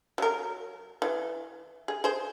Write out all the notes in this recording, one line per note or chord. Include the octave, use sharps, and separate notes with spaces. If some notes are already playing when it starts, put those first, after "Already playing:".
F#3 A#4
E3
G#4
G#4 C5